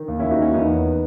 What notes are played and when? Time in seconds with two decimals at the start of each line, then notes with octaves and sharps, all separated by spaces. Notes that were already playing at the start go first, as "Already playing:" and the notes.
Already playing: D#3
0.08 D#2
0.19 D#2 C#4 E4
0.31 D#4 F#4
0.38 D#2 C#4 E4
0.53 E2 B3 D#4
0.69 E2